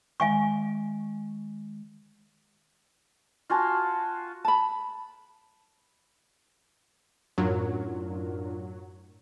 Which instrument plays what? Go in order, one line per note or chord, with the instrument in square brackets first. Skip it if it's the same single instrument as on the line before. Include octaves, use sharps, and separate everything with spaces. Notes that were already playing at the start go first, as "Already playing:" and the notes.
[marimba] D#3 G#3 [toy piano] F5 G#5 C#6
[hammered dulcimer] F4 F#4 G#5 A5
[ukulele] A5 B5
[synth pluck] F#2 A2 [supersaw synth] F#3 [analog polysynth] D4 F4 A#4